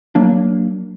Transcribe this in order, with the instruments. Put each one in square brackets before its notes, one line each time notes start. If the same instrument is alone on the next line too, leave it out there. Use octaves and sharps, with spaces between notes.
[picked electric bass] F#3 A#3 D4